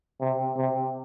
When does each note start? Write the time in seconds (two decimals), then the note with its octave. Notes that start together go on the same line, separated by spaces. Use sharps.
0.21 C3
0.57 C3